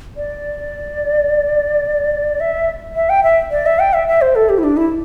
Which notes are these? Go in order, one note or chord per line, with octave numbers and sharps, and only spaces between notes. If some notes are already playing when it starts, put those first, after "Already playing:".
D5
E5
E5
G5
E5
D5
E5
G5
E5
E5
C5
A4
G4
E4
D4
E4